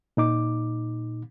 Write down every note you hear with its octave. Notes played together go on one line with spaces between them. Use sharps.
A#2 D#4 D6